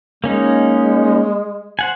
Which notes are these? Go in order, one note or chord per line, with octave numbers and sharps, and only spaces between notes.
G#3 A#3 C#4 D#4
C5 F#5 G#5